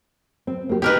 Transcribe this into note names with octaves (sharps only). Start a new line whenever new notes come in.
C4
A#3 G4
B3 D#4 G4 A#4 B4